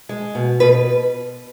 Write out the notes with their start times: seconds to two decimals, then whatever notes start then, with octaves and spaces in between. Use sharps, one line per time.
0.09 G#3
0.35 B2
0.60 B2 B4